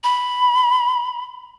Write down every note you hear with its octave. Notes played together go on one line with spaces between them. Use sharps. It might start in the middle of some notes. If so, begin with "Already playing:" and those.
B5